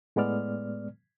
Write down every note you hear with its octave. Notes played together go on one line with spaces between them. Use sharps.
A2 G#3 B3 D5 F6